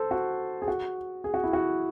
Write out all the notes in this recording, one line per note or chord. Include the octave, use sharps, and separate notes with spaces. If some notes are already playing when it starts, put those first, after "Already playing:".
Already playing: A4 C5
F#4
G#4
F#4
G#4
F#4
E4
F#4